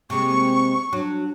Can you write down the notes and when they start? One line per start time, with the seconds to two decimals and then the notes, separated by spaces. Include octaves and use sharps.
0.10 C3 G#3 A#3 C#6
0.93 F#3 D4